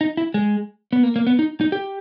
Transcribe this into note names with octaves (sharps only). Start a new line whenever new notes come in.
D#4
E4
G#3
B3
A#3
A#3
B3
D#4
D#4
G4